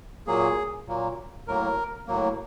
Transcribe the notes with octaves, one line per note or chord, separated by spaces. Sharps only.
A#2 F#3 A#3 G#4
A#2 F#3 A#3
A2 F#3 A#3 A#4
A2 F#3 A#3